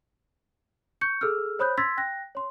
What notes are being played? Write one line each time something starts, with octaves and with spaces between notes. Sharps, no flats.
C#6 G6 C#7
G#4 A4 E6 F6
C5 C#5 B5 D#6 F#6 G6
C6 E6 G#6 A6 B6
G5 F#6 A#6
C#5 C6